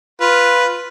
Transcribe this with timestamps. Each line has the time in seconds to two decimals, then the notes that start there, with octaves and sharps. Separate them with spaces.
0.21 F4 B4